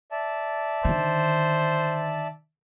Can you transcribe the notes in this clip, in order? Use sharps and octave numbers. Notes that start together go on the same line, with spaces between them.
D5 E5 A5
D3 D#3 C5